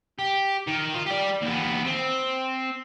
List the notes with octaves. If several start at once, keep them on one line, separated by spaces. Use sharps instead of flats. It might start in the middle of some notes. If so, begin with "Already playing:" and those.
G4
D#3
F4
G4 D5
D#2 B3
C4